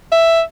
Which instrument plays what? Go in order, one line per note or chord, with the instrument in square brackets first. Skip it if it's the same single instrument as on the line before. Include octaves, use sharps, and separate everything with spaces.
[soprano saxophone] E5